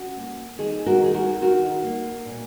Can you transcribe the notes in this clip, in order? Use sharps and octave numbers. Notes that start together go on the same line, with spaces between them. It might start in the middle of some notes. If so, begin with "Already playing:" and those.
Already playing: C#4 F#4
A#3
D#3 G#4
F#4 A#4
D#3 G#4
F#4 A#4
D#4 F#4 A#4
A#3
A#2